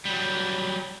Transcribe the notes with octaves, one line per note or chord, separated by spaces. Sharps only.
F#3 G3